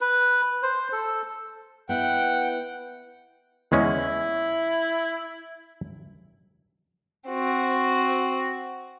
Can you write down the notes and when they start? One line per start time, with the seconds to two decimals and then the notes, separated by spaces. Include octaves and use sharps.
0.01 B4
0.63 C5
0.92 A4
1.89 B3 E4 F#5 G5
3.72 E2 G#3 C#4 E4
7.28 C4 F#4